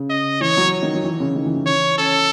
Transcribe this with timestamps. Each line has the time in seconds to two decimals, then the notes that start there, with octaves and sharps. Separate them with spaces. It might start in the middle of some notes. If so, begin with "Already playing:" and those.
Already playing: C#3
0.10 D#5
0.40 E3 C#5
0.57 F#3
0.82 D#3
0.94 F#3
1.04 E3
1.20 C#3
1.35 D#3
1.46 E3
1.56 E3
1.66 C#5
1.98 C#4 A4